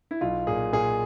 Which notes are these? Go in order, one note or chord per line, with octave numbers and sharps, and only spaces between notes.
E4
B1 F4
A#2 G#4
A#2 G#4